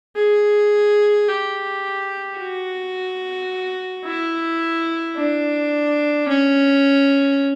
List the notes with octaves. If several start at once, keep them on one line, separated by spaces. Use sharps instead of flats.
G#4
G4
F#4
E4
D4
C#4